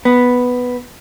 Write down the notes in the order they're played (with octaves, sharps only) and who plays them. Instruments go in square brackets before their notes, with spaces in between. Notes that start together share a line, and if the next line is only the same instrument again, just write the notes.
[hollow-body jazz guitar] B3